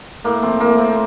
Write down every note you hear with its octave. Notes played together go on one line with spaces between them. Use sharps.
A2 A#3
F3 C4
A2 A#3
F3 C4